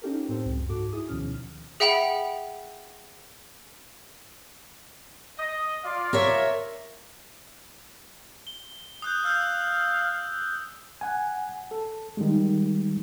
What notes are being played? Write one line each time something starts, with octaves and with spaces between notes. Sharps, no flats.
C#4 D#4 F4 G4 A4 A#4
A2 C4 A4 C5
C#2 F#2
G#2 F#4 A4 D6
E4 G#4 D#6
D2 B2 D#3 F3 C#4 F6
G#4 E5 F#5 G5 B5 F7
D#5
F4 D5 F5
A#4 C#5 E5
G7
D#6 F#6 G6
F5 E6 G6
F#5 G#5
A4
D#3 G3 G#3